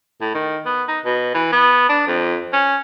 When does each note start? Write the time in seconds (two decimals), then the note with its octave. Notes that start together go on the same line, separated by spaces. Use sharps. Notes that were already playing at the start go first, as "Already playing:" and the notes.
0.21 A2
0.34 D#3
0.66 B3
0.88 D#4
1.05 B2
1.34 E3
1.52 B3
1.89 D4
2.08 F2
2.53 C#4